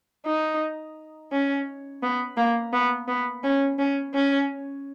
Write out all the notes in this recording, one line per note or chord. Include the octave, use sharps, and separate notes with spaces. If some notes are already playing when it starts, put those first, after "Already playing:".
D#4
C#4
B3
A#3
B3
B3
C#4
C#4
C#4